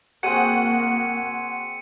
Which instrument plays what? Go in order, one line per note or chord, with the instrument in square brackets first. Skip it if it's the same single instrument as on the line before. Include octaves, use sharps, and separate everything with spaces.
[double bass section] A#3 [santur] C4 G#4 [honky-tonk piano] F#4 [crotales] C#7 D#7